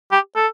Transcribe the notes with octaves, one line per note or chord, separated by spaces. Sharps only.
G4
A4